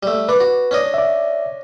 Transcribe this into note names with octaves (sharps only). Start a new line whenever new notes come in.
G3 A3
D4 B4 D5
F#4
C#4 D4 D#5
D5 E5